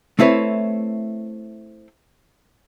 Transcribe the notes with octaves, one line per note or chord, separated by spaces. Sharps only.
A3 C4 E4 B4 C#5